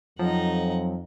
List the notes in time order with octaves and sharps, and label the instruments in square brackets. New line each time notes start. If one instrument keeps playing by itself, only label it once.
[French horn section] F2 [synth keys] F3 [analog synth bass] F#3 [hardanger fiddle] D#4 F#5